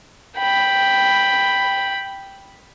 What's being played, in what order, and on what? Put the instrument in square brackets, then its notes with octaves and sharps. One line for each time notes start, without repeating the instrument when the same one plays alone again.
[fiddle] G5 B5